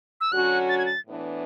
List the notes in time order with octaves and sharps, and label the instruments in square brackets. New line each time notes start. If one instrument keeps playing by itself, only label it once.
[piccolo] E6
[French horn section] D3 F#3 C#4 F#4 [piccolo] F#6
[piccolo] A6
G#6
A6
[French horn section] A2 E3 B3 D4